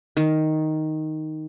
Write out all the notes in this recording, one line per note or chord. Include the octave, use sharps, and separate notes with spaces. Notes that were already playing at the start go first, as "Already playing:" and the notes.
D#3